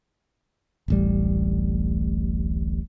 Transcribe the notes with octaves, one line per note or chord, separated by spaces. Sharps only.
D1 A1 G3